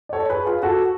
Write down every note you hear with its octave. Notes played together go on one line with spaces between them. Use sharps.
D5
A4 C#5
G#4 B4
F4 G#4
F#4 A4